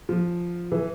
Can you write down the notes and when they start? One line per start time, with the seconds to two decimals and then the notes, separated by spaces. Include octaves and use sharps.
0.09 F3
0.72 E3